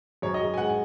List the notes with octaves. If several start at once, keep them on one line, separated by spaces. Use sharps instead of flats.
F#2 C#5
D#5
F#2
G#5
G#3 F#5
G#5